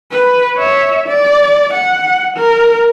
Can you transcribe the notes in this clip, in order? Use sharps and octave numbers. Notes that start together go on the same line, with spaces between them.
B4
C#5 E5
D5
F#5
A#4